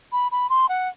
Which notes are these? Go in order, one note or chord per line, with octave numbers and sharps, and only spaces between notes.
B5
B5
C6
F#5